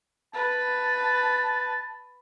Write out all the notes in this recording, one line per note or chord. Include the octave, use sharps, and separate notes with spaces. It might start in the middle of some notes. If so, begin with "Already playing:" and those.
B4 A5